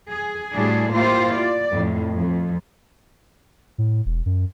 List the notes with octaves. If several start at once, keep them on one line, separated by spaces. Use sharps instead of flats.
G#4
A2 G3 D4 E4 F#4 G#4
A#3 E4 F4 G4 C5
D5
F2 A2
F2
A2
E1
F#2